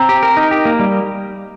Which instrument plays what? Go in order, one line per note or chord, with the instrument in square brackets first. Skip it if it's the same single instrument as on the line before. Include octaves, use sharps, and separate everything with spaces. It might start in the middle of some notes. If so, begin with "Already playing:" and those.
Already playing: [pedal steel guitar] C4 [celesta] A#5
[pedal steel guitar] G4
A#4
D#4
G4
A#3
G3